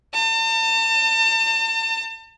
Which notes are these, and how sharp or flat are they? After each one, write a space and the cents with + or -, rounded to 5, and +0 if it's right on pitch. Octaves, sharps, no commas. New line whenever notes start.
A5 +40